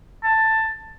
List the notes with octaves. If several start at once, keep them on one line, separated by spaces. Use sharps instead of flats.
A5